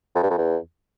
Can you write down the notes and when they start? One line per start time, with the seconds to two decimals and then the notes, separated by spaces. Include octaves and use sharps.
0.15 F2
0.23 G2
0.30 F2
0.38 E2